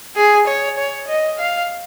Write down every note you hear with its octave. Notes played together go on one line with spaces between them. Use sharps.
G#4
C#5
C#5
D#5
F5